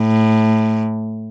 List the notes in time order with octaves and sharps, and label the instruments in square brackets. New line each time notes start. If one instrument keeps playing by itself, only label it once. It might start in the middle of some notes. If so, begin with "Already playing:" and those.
Already playing: [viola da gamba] A2